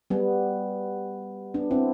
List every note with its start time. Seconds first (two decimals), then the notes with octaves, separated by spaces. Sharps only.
0.10 G3 B3
1.54 B3 D4
1.71 C4 E4